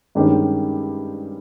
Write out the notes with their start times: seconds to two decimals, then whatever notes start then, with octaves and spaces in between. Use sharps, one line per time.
0.15 G2 D#3 G#3 C#4 G4